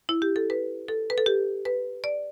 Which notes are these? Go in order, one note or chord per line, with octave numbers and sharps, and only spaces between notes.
E4
G4
A4
B4
A4
B4
A4
G4
B4
D5